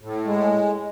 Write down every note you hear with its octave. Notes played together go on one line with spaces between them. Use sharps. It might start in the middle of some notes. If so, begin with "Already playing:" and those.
A2
G#3